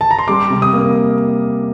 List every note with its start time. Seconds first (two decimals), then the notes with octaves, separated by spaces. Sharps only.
0.01 A5
0.11 A#5
0.19 C6
0.28 G3 D6
0.50 C3
0.62 D#6
0.73 A#3